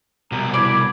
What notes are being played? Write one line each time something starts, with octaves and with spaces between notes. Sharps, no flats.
C2 B2 A#5
E4 D5 B5 G#6